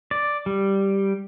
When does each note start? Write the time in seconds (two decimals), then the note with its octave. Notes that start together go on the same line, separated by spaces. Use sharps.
0.11 D5
0.46 G3